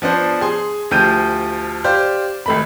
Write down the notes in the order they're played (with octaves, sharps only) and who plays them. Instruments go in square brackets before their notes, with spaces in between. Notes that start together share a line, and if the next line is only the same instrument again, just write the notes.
[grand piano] F3 B3 D4 C5
G#4 C6
D2 F3 G4 G6 D#7
G4 C5 D5 F5
G#1 A3 B5